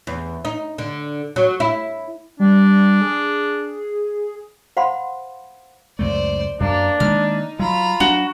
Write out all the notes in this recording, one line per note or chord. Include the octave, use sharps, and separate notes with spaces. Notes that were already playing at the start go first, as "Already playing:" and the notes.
E2
D#4
D3
F#3
E4
G3 D4
G#4
C5 F5 F#5 B5 C6
C#2 F#2 A3 C5 D5
F#2 A#3 D4
D#3 G#3 A#3 D#4 F6
F#3 F4 A#5 B5
F#3 D4 F#4